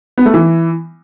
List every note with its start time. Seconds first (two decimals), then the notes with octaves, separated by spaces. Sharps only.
0.18 B3
0.26 A3
0.34 E3